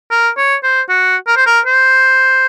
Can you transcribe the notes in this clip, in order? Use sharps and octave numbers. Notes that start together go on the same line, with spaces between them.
A#4
C#5
C5
F#4
A#4
C5
A#4
C5